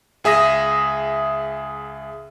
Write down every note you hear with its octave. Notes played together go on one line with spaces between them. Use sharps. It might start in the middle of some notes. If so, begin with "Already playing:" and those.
C#2 G#4 E5 D#6 A#6